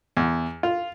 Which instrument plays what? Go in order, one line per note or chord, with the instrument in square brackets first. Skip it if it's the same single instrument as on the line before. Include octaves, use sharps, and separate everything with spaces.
[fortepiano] E2
F4